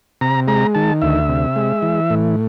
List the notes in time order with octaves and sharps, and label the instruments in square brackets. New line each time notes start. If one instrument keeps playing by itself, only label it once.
[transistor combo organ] C3 A#5
G#3 A#5
D#3 A5
D2 E5
C3
G#3
E3
A2